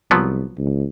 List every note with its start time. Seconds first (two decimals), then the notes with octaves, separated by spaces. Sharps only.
0.11 C2 F3 F#3 B3
0.58 C#2